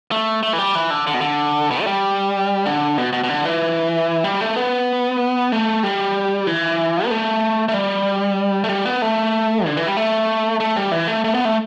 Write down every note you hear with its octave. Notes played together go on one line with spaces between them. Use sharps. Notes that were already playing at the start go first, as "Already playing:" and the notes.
A3
A3
E3
G3
E3
D3
D3
B2
D3
B2
A3
G3
D3
B2
B2
B2
D3
E3
G3
A3
B3
A3
G3
E3
B3
A3
A3
G3
A3
G3
B3
A3
D3
E3
G3
A3
A3
G3
E3
A3
A3
B3
A3